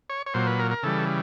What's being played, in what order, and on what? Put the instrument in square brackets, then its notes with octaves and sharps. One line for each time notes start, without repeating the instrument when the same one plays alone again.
[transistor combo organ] C#5
C#5
A#2 F#3 C5
B4
A#4
A#4
C#3 E3 G3 A4